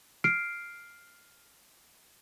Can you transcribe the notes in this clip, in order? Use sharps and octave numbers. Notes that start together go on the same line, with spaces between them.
F6 C7 D7